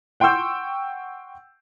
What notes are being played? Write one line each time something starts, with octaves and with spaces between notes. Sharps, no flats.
F#5 G5 C6 C#6 E6 G6